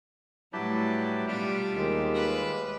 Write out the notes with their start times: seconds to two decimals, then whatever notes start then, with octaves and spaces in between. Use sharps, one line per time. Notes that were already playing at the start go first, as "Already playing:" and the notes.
0.53 A2 F#3 G3 D4 E4 G4 B4 A5
1.28 B2 G3 D4 F4 G4 E5 D6
1.76 D#2 G#3
2.15 B4